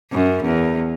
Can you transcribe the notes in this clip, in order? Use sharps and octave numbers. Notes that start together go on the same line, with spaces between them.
F#2
E2